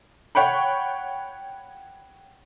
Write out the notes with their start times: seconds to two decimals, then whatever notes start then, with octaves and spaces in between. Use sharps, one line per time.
0.35 C#5 F#5 G5 B5